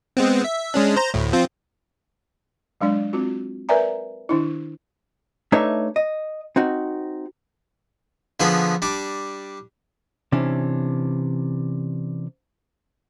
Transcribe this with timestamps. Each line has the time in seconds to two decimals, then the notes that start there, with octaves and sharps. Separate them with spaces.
0.17 G#3 B3 C4
0.44 E5
0.74 G#3 C#4 D4
0.96 C5 A#5
1.14 D2 A2
1.33 F3 C4 F4
2.81 F#3 G#3 D4 D5
3.13 C4 F4 F#4
3.69 A#4 B4 D5 E5 G#5 A#5
4.29 D#3 D4 E4
5.52 A3 D4 D#4 B4 C#5 E5
5.96 D#5
6.56 C4 D#4 F#4
8.40 D3 F3 B3 G#4 B5 C6
8.82 G3 D4 D6
10.32 C3 E3 C#4 D4